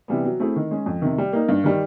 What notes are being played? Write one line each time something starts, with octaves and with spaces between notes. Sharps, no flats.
C3 E3 G3 B3
F#3
A3 C4 E4 G#4
D#3
G#3 C#4
F2
C3 D#3
G3
A#3 D#4
G2
D#3 G3